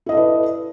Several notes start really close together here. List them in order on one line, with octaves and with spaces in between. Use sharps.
E4 D#5 A4 D5 B4